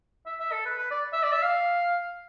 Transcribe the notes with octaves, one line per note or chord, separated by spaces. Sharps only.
E5
E5
A4
B4
B4
D5
E5
D5
E5
F5